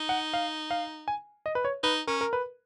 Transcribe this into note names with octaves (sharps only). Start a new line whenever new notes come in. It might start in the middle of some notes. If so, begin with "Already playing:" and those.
Already playing: D#4
F#5
F5
F5
G#5
D#5
B4
C#5
D#4 B4
C#4 A#4
A#4
B4